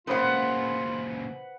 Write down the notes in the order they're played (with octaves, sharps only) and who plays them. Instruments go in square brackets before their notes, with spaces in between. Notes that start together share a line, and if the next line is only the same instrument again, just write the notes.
[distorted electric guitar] A#2 C#3 [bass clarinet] F4 [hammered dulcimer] B4 F#5 [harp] C5 D#6 G6